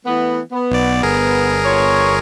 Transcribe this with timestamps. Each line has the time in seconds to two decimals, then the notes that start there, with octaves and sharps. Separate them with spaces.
0.06 E3 A3 B3
0.52 B3
0.71 B1 D5
1.03 G1 G#4 A#4
1.65 B3 F4 C#5